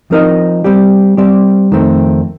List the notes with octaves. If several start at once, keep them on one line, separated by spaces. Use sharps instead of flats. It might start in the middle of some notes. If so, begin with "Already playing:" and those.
F3 C4 D#4 A#4 D#5
G3 C4 G4 D5
G3 C4 G4 D5
F2 D#3 A3 C4